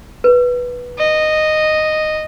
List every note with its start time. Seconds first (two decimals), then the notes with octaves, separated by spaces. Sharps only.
0.24 B4
0.99 D#5